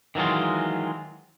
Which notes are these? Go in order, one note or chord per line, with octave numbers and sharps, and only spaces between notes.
D#3 E3 F#3 G#3 F4